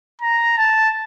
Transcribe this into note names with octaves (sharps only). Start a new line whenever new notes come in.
A#5
A5